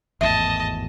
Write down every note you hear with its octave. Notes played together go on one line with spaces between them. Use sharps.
G#1 E2 A2 D#5 E5 A5